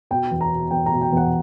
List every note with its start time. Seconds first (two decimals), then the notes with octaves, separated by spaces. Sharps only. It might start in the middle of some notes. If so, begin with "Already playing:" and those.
0.11 B2 G5
0.31 E2
0.41 A#5
0.51 B2
0.71 E2 G5
0.86 A#5
0.92 B2
1.02 G5
1.12 E2
1.17 F#5